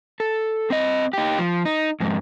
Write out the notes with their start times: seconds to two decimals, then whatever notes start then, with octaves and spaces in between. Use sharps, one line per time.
0.20 A4
0.71 C4 D#5
1.13 D#4 G4
1.39 F3
1.65 D#4
2.00 F2 G#2